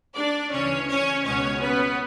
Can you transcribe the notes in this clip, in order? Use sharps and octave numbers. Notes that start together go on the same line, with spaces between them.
D4 D5
D2 C#3 E3 C#4 C#5
C#4 C#5
C#2 B2 G#3 B3 C#4 C#5
B3 B4